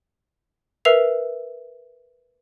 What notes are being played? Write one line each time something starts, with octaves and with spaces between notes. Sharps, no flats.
A#4 B4 E5 E6 C7 F7